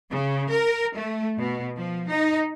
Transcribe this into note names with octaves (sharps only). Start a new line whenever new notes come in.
C#3
A#4
A3
B2
F3
D#4